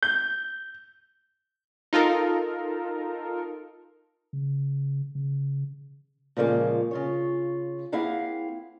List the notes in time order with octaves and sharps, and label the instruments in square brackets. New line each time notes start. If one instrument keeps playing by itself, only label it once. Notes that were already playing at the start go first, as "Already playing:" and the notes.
[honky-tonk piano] G6
[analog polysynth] D#4 F4 A4 A#4
[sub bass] C#3
C#3
[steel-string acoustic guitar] A#2 C#3 F3 G#3 A#3
C#3 F4 C#5
A#3 C4 E4 G#4 F5 F#5